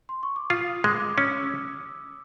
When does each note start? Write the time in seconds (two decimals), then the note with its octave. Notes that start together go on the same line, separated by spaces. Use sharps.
0.09 C6
0.23 C#6
0.36 D6
0.50 F4 D#6
0.67 D#6
0.84 G#3 D6
1.00 D6
1.17 C#4 D#6
1.40 E6